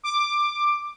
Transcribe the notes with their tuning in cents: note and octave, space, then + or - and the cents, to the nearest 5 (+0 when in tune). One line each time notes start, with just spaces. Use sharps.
D6 +10